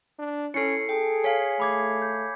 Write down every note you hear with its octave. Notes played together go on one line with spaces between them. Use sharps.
D4
C#4 E4 A4 C7 C#7
G#4 A4 G5
C#5 F5 G#5 B6
A3 B5 D6 G#6
G6